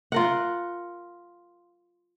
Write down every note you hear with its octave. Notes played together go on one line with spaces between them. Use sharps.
F4 A#4 F#5